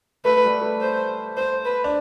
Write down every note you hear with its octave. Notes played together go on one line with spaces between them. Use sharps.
A3 B4
G3
A3
C5
C5
B4
D4